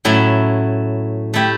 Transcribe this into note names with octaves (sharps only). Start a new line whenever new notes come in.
A2 F#3 C#4 E4
A3 E4 G4